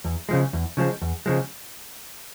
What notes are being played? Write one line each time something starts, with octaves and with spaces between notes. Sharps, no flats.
E2
C#3 F3 G#3
E2
C#3 F3 G#3
E2
C#3 F3 G#3